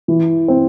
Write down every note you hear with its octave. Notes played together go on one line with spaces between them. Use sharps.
E3
C4